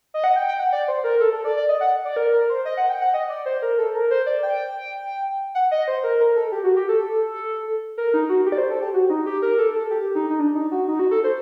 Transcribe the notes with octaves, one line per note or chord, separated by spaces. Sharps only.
D#5
F#5
G5
G5
F#5
D5
C5
A#4
A4
A4
D5
D5
D#5
F#5
D5
A#4
A#4
C5
D#5
F#5
G5
F#5
D#5
D5
C5
A#4
A4
A#4
C5
D5
G5
F#5
D#5
C5
A#4
A#4
A4
G4
F#4
G4
A4
A#4
D#4
F#4
G4
D5
C5
A4
G4
F#4
D#4
G4
A#4
A4
A4
G4
D#4
D#4
D4
D#4
F#4
D#4
F#4
A4
C5